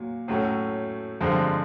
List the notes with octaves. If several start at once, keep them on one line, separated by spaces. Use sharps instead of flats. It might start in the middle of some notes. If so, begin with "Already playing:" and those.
Already playing: A#2 F#3
A2 F#3 A3 C#4
G2 D3 F3 G#3 C4